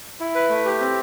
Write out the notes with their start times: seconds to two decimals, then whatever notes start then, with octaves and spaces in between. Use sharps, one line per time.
0.20 E4
0.35 B4
0.49 A3
0.65 G4
0.80 C4